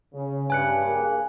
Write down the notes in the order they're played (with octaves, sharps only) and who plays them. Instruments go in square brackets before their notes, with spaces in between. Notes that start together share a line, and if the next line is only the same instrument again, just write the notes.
[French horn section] C#3
[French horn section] G2 [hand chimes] G#5 F#6 C#7
[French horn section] A#3 G#4